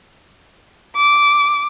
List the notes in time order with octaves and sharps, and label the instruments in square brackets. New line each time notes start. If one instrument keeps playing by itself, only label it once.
[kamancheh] D6